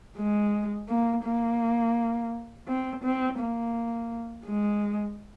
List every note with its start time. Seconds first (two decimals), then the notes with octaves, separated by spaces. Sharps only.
0.17 G#3
0.89 A#3
1.24 A#3
2.68 C4
3.04 C4
3.40 A#3
4.46 G#3